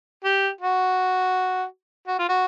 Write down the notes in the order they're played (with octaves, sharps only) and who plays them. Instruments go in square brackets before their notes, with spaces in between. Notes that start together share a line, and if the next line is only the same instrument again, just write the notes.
[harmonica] G4
F#4
F#4
F4
F#4